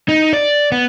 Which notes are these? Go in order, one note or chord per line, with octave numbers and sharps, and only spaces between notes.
D#4
D5
B3